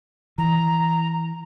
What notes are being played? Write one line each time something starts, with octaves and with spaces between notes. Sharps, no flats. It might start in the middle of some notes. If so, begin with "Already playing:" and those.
E3 A#5